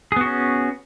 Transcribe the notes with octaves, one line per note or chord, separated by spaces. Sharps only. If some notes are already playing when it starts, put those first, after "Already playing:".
B3 C#4 F#4 G#4